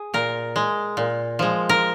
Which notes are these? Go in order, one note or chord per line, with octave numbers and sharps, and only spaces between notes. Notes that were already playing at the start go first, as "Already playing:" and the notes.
Already playing: G#4
A#2 A#4
G#3
A#2
F3 G#3
A#4